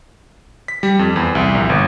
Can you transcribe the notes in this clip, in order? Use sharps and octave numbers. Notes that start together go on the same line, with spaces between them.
B6
G3
F2
E2
C2
A#1
G1